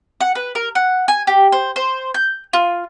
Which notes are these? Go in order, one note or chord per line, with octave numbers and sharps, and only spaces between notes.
F#5
B4
A#4
F#5
G#5
G4
C5
C5
G6
F4